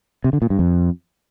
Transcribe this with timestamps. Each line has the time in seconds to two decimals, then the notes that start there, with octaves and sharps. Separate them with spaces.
0.24 C3
0.33 D3
0.42 A#2
0.50 G2
0.59 F2